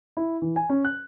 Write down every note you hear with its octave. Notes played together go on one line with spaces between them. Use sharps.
E4
E3
G#5
C#4
F#6